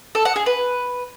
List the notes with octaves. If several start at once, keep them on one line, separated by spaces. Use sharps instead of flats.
A4
F#5
G#4
B4